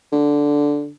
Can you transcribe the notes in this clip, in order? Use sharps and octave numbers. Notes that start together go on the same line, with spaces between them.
D3